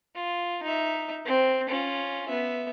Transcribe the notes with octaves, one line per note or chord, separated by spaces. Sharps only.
F4
D#4 E5
C4
C#4 F4
B3 E5